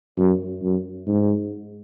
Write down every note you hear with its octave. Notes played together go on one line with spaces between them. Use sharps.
F#2
F#2
G#2